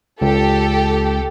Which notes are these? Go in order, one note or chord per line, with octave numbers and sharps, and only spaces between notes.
C#2 G4 A4